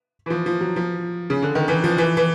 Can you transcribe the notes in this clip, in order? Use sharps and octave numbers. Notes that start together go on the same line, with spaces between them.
E3
F3
F3
F#3
F3
C#3
D3
D#3
E3
F3
E3
E3